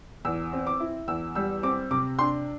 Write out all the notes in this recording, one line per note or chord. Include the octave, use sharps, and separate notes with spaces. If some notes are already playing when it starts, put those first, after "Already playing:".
E2 E6
C4
D6
E4
E2 E6
G3 E6
C4 D6
C3 D6
D4 C6